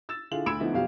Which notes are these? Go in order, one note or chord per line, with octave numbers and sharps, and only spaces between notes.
E6 A6 E7
D3 E4 F4 G#4 F#7
D2 B5 E6 G#6 D7 E7
D3 F3 A3 B3 D#4 E4
F2 B2 F#3 F4 G4 F5